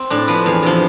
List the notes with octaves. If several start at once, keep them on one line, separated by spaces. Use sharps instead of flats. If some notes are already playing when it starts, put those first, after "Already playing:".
Already playing: C4
A2 D4
F3 B4
E2
C3 F3